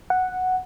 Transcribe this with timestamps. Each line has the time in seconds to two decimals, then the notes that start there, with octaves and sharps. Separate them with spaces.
0.10 F#5